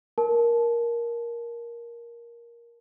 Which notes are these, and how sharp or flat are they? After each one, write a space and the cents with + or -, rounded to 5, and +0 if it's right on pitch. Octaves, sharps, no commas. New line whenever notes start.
A#4 +10 A5 -25